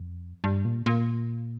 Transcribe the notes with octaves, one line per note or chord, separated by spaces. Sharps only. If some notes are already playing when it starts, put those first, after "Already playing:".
Already playing: F2
G2
A#2
A#2